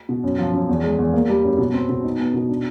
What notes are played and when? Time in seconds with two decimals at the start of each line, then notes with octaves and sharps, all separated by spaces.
0.09 B2
0.24 F#2
0.39 F3
0.53 F#2
0.69 E2
0.83 G#3
0.99 E2
1.13 A#3
1.29 G3
1.44 F#2
1.58 B2
1.74 C4
1.89 B2
2.04 D#4
2.19 B3
2.34 B2
2.49 D4